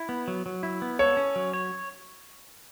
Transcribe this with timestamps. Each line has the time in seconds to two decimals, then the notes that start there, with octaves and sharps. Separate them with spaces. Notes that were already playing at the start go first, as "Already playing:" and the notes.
Already playing: E4
0.09 B3
0.28 F#3
0.46 F#3
0.63 E4
0.82 B3
0.99 A4 C#5
1.17 C#4
1.36 F#3
1.53 C#5